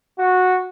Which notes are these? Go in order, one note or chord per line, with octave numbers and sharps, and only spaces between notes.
F#4